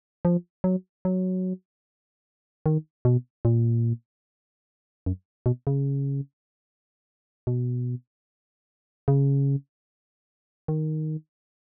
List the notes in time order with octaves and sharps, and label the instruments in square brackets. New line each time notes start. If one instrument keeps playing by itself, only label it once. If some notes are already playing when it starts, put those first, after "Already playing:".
[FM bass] F3
F#3
F#3
D#3
B2
A#2
F#2
B2
C#3
B2
C#3
D#3